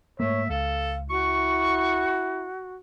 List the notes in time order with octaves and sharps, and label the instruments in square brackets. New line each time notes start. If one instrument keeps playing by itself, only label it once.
[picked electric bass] G#2 A3 A#3 [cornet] C#5 [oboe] E5
[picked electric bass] C#2 [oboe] A4 [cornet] F5
[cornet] E4 [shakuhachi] F#4 [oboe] C#6